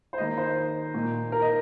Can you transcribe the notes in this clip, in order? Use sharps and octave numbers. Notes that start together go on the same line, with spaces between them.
C5
D#3 A#3 D#4 D#5
C5
A#2 A#3 D#4
A#4
D#5